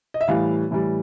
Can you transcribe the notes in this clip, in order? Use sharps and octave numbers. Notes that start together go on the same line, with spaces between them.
D#5
E5
A2 E3 G3 F5
A2 E3 G3